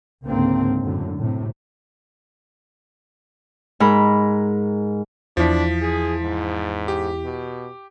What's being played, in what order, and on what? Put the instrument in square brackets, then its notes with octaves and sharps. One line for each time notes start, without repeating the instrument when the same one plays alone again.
[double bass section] C#2 G#2 D3 A#3 C4
F#2 A2 D3
A2 C3
[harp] G#2 A#4 B5
[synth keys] E2 E4 B6 [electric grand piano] F3 [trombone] D4
[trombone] G#4
G#2
[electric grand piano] G4
[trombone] B2